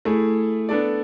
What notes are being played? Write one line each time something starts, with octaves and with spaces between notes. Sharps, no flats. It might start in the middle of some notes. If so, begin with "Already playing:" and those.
A3 E4 G#4
B3 D4 A4 D5